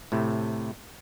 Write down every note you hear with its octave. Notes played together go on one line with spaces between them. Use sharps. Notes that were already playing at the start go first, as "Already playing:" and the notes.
A2 C3 A3